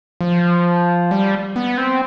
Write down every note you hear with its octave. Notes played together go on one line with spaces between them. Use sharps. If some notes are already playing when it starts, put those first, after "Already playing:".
F3
G3
B3
C4